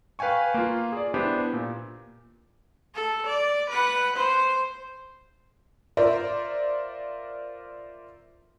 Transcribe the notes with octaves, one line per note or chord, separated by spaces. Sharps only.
B4 F5 G5 G#5 C#6
A#3 F4
G#4 D5
B3 D4 E4 G4 C5
A#2
A4
D5
B4 F#5
C5
F4 A#4 C5 D5 E5